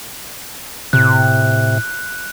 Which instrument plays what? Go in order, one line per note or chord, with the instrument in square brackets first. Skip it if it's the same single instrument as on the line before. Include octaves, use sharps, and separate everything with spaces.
[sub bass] A2 [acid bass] C3 [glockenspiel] F#6